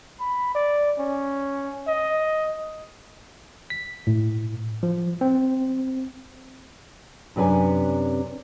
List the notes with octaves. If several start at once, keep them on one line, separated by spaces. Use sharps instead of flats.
B5
D5
C#4
D#5
B6
A2
F3
C4
F#2 C3 D4 B4 G#5